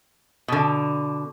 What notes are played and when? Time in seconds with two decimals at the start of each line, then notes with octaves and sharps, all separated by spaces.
0.48 B2 D3